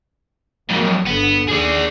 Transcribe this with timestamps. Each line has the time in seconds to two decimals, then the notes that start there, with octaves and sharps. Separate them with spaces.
0.70 F2 G#2 F#3 A#3
1.07 G1 D3 B3
1.48 D#2 G#4 D5